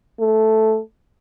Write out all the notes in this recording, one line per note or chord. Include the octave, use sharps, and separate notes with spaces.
A3